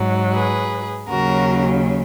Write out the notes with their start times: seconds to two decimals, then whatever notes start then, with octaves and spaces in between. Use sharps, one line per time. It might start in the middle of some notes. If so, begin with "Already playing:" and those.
Already playing: G#2 F#3
0.33 G#4 B4
1.08 D#2 C#3 F#3 F#4 A#4